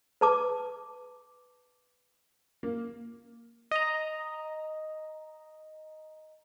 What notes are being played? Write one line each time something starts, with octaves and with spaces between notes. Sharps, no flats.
B4 A5 D6
A#3
D#5 A#5